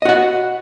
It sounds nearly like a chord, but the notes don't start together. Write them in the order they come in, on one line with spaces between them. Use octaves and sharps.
D#5 F#4 F#5